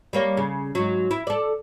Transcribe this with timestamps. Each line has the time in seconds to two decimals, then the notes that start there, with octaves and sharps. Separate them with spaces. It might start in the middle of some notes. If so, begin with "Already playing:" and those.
0.13 G3 A#3 C#5
0.37 C#3
0.75 G#2 F#3
1.11 E4
1.27 A4 D5